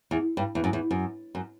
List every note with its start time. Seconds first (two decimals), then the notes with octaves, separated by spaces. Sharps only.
0.11 E2
0.37 G2
0.55 E2
0.64 F#2
0.73 E2
0.91 F#2
1.35 F#2